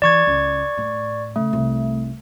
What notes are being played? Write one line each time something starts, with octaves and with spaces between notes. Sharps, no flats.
E3 D5 C#6 G#6
C#2
A2
C#3 A3
C2